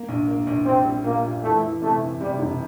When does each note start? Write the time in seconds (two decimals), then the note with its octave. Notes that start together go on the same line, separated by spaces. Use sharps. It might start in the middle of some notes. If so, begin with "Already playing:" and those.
Already playing: A#3
0.08 A#1
0.28 A#3
0.47 A#1
0.66 A#1 C4
0.85 G3
1.04 A#2 A#3
1.24 A#2
1.43 E2 A3
1.63 E2
1.82 C3 A3
2.01 E3
2.20 C3 G3
2.39 E1